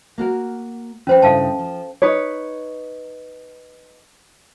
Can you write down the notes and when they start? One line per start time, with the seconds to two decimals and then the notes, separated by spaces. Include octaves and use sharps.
0.18 A#3 F#4 A#4
1.07 F3 C#4 B4 C5 G5
1.22 G2 C#3 E4 A4 F5 A5
1.59 F3
2.02 D#4 B4 C#5